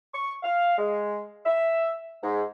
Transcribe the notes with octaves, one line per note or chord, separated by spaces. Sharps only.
C#6
F5
G#3
E5
G#2